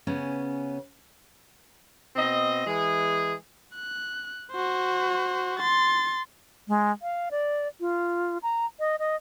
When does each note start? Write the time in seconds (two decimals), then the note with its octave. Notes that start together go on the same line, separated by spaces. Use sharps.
0.07 C#3 B3 C#4
2.16 B2 C4 D#5
2.67 E3 G#3 G#4
3.75 F#6
4.52 F#4 C5
5.60 C6 A6
6.68 G#3
7.02 F5
7.31 D5
7.81 F4
8.43 A#5
8.80 D#5
8.99 D#5